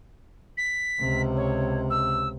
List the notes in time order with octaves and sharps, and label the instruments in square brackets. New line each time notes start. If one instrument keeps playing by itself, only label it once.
[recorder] B6
[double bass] C#2 C3
[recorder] C#5
E6